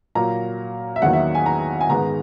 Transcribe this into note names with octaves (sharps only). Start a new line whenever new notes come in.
A#2 F#3 A#3 A#5
E5
E2 D#3 F#3 A#3 F#5
E5
G#5
A#5
G#5
G#2 D#3 G#3 B3 A#5